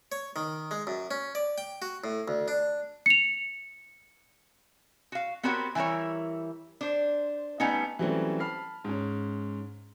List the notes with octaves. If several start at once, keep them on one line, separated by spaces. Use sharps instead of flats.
C#5
D#3
G#3
F#2
C#4
D5
G5
F#4
A2
D2
D4
C#7 F7
F#4 F5
B3 C4 F#4 G4 A#4 C#5
E3 G3 E4 A#4 C#5
D4 C5
G3 A3 B3 C#4 D#4
E3 F#3 G3 A3 C4 C#4
A5 B5 F6 C7
G#2 C#4